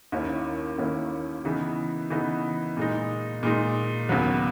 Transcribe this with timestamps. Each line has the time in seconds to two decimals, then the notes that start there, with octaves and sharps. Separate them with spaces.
0.12 D#2 D#3 A#3 C#4 E4
0.78 D#2 D#3 A#3 C#4 E4
1.45 C#3 E3 B3 D#4
2.10 C#3 E3 B3 D#4
2.77 A#2 G#3 D#4
3.43 A#2 G#3 D#4
4.09 D#2 C#3 F#3 B3